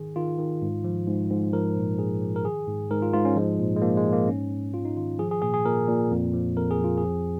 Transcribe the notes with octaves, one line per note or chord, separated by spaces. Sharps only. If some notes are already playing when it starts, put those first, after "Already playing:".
Already playing: G#2 D#3 G#4
D#3 F4
D#3
G#2
F3
G#2
G#2
F3 A#4
A#2
A#2 G#4
F3
A#4
D#3 G#4
G#2
G#2 A#4
F4
G#2 F4
C#4
F3 G#3
A#2
G#3
F3 A#3
G#3
F3
A#3
G#2 C#4
G#2
G#2 F4
D#4
D#3 F4
F3 G#4
G#4
A#2 G#4
G#4
A#2 A#4
A#2
F2
F3
F2 A#4
G#4
F2 F4
F3 G#4